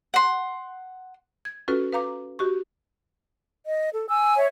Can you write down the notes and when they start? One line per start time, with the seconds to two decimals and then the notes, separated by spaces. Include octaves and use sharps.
0.14 F#5 C6
1.45 G#6
1.68 C#4 F4 F#4 A4 B4
1.92 B4 F5 A#5 D6
2.39 F#4 G4 C#6
3.66 D#5
3.93 A4
4.09 G#5 E6
4.37 C#5 E5